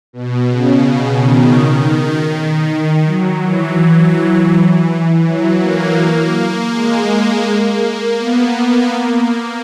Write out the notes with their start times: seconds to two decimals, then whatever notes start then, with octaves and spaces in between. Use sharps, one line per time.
0.13 B2
0.50 C#3
0.86 C#3
1.22 D#3
3.06 F#3
3.42 E3
5.26 F#3
5.62 A#3
5.99 A#3
6.72 G#3
7.46 A#3
8.18 B3
8.55 A#3
8.91 A#3